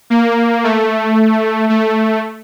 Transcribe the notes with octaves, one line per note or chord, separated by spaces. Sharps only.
A#3
A3
A3